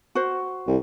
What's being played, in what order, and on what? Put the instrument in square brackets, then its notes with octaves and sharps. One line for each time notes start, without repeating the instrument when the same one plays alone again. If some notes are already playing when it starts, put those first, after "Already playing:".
[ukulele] F#4 C5
[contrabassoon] C2